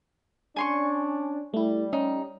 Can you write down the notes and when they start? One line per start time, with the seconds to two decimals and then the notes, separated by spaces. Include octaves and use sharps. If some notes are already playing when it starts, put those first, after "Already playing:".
0.56 C#4 D4 G#5 C6 C#6
1.54 G3 A3 E4
1.93 C#4 D#4